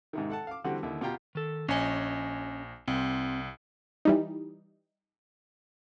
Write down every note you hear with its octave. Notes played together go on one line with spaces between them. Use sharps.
G#2 C3 D#3
A4 F#5 A5
F5 D6
D3 E3 G3 C4 F#4 G4
D#2 D3 E4 E5
B2 F4 G4 G5 A#5
D#3 A4
A#1 C#4 C#5 D#5 G#5
C2 C4
E3 G3 D#4